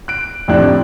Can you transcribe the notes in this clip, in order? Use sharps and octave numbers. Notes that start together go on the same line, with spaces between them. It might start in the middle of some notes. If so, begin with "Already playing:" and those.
F#6 D7
F2 A2 C3 C4 D4 F#6